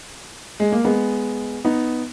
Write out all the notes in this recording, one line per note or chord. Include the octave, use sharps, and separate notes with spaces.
G#3
A#3
G#3 B3
B3 D#4